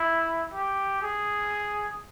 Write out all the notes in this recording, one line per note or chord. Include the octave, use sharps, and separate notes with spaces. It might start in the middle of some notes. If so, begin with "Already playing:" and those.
Already playing: E4
G4
G#4